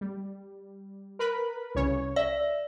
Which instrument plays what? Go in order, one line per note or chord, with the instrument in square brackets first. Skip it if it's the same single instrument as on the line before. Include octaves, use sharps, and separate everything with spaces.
[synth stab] G3
A#4 B4 B5
C2 C#3 C#5
[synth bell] D5 [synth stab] E5